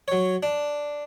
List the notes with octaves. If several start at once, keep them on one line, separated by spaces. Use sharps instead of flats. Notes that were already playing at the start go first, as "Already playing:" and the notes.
F#3 C#5
D4